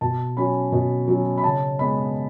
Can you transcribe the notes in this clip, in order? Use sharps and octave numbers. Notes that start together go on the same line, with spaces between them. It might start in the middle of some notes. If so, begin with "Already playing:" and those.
B2 A5
F#3 C#4 B5
B2
F#3 C#4
B5
C#3 A5
G#3 B3 B5